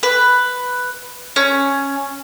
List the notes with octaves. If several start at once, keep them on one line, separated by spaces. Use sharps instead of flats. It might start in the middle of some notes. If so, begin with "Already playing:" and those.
B4
C#4